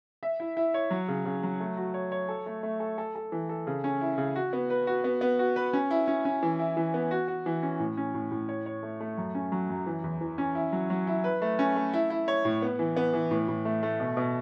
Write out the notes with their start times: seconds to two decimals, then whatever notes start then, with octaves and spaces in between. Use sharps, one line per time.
0.23 E5
0.40 E4
0.57 E4
0.74 C#5
0.90 F#3
1.08 C#3
1.25 C#3
1.43 F#3
1.60 A3
1.77 F#4
1.94 C#5
2.12 C#5
2.29 A4
2.46 A3
2.63 A3
2.80 A4
2.98 A4
3.15 A4
3.32 E3
3.49 A4
3.67 C#3
3.84 C#4
4.01 E4
4.18 C#3
4.36 F#4
4.53 B3
4.70 B4
4.87 F#4
5.04 B3
5.21 B3
5.39 F#4
5.56 B4
5.73 C#4
5.91 E4
6.07 C#4
6.25 C#4
6.43 E3
6.59 E4
6.77 E3
6.94 B3
7.11 F#4
7.28 F#4
7.46 E3
7.63 C#4
7.80 A2
7.97 C#4
8.14 A2
8.31 A2
8.49 C#5
8.66 C#5
8.83 A3
9.00 A3
9.18 F#2
9.35 C#4
9.52 F#3
9.69 F#2
9.86 E3
10.04 E2
10.21 E3
10.38 C#4
10.55 E4
10.73 F#3
10.90 F#3
11.07 E4
11.24 B4
11.42 A3
11.59 C#4
11.76 A3
11.93 E4
12.10 E4
12.28 C#5
12.45 A2
12.62 B3
12.79 E3
12.96 B3
13.13 E3
13.31 A2
13.48 A2
13.65 A3
13.83 A3
14.00 B2
14.17 B2